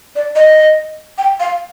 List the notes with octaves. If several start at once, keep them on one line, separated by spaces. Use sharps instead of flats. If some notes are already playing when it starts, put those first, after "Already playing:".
D5
D#5
G5
F5